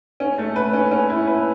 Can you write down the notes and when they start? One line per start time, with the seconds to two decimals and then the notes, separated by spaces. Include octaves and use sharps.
0.20 C#4
0.38 A3
0.56 B4
0.73 C#4
0.91 C#4
1.10 E4
1.27 B4